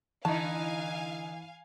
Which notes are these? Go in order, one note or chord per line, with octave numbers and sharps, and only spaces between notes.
D3 E3 D#4 E4 F5 G#5 A5